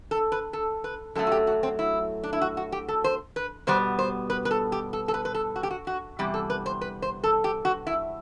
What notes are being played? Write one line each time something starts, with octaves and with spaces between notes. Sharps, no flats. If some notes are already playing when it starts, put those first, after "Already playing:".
A4
B4
A4
B4
F#2 F#3 A3 A4
F#4
G4
F#4
C4
E4
D4
E4
F#4
F#4
G4
A4
C5
B4
B2 G3 B3 C5
C5
B4
B4
A4
G4
A4
A4
B4
B4
A4
F#4
G4
F#4
F#4
E2 C3 G3 G4
A4
B4
C5
B4
C5
A4
G4
F#4
E4